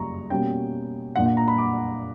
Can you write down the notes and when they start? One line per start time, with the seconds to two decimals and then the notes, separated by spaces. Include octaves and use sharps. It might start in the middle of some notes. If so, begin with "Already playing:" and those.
Already playing: F#2 C#3 G3 A#3 A#5 C#6
0.30 B2 G3 A#3 C#4 G5
1.16 A#2 A#3 D4 F#5
1.26 F#5
1.37 A#5
1.48 B5
1.58 D6